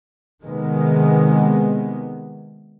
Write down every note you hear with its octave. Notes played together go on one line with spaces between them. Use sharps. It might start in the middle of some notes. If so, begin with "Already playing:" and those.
C3 D#3 G#3 B3